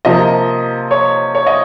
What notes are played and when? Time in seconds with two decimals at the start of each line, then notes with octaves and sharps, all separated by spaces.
0.05 C3 F3 A#3 D#5
0.91 C#5
1.35 C#5
1.47 D#5